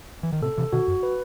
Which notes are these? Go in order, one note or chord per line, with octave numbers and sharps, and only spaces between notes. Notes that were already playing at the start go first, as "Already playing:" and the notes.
E3
D#3
A2 C3 A4
C3 E3
B2 D#3 F#4
F#2
B4